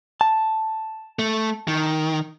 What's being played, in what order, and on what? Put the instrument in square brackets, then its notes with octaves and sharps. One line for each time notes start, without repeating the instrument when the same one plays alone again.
[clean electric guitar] A5
[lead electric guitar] A3
D#3